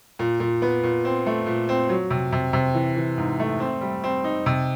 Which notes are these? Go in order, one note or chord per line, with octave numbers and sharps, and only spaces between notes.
A#2
A#2
B3
A#2
C4
A3
A#2
C4
F#3
C3
C3
C3
E3
E3
G#2
A3
C4
G3
C4
D#4
C3